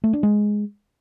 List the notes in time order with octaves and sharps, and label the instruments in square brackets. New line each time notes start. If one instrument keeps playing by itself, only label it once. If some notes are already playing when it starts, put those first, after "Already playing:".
[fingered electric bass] A3
D4
G#3